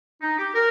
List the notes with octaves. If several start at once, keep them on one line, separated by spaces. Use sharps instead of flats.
D#4
G4
A#4